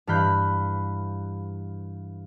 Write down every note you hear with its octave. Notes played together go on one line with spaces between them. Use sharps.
G2 E3 F5 B5 F#6 G6